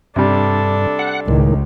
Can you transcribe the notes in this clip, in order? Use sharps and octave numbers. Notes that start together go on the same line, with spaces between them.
G2 C3 G3 D4 A4
F#5
C#2 A2 D#3 G#3